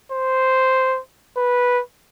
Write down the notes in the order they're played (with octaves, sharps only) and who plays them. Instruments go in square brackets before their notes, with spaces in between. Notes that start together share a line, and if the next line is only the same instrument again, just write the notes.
[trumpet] C5
B4